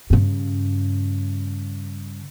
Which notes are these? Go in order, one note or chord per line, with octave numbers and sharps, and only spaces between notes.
G2 C#3